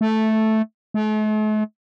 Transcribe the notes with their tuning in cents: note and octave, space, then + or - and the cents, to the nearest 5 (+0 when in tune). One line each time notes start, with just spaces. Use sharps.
A3 -5
A3 -45